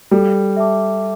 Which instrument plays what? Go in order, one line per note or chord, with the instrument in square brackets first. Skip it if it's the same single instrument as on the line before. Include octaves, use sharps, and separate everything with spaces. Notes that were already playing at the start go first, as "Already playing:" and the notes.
[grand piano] G3 [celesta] A4
[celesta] E5 A5 D6